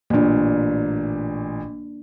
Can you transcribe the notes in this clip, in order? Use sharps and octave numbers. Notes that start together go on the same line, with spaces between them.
A1 A#2 A#3 D4